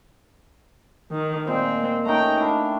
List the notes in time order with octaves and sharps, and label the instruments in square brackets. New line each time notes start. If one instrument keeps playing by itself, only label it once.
[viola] D#3
[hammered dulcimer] A#2 G#3 [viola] C4
[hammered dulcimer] A3 C#4 D#4 [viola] G5 A#5
[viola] D4 [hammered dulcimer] E4 F5 G5